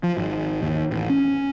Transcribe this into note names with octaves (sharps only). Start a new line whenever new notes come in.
F3
G#1
D#2
A1
C#4